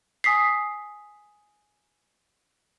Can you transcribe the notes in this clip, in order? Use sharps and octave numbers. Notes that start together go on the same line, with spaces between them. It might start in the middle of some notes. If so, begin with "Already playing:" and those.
G#5 D#6 B6 C7